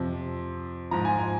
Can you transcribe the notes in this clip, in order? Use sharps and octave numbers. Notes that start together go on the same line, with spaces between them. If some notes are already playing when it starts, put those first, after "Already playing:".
Already playing: F2 C3 F3
G#2 F3 A#5
G#5
G#5